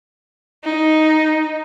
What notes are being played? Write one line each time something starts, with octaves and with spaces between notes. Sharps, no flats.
D#4